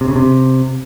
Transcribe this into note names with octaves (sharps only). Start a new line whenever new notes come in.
C3
C#3
C3